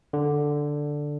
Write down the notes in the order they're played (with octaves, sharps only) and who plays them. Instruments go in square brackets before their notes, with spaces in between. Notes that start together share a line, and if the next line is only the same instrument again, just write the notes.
[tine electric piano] D3